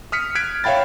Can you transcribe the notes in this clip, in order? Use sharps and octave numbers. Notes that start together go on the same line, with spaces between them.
D#6 F6 B6 C#7
F6 F#6 G#6 B6 D7
C#5 E5 F5 G5 B5 A6